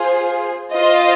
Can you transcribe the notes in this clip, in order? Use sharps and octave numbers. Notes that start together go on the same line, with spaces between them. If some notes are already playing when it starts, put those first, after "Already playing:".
Already playing: F4 G#4 C5
F4 C5 D#5